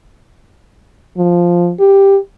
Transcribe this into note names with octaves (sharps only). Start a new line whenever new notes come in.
F3
G4